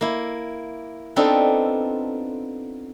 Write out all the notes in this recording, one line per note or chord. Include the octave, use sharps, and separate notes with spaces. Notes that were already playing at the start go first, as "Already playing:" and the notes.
A#3 E4
B3 C4 D4 D#4 F4 A4